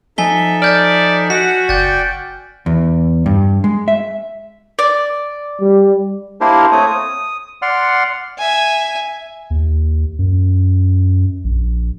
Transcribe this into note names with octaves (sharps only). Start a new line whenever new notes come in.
F3 D#4 A4 E5 G#5 B6 G7
D5 F6 G6 A6
F#4 F#5 B6
F#1 D5 G5 G6 A6
E2
G2
G#3
E5
D5
G3
A#3 D4 E4 G4 A#4 C5
A3 C4 C#5 D#6
D#6
D5 F#5 C6 F6
E5 G#5
D#2
F#2
A#1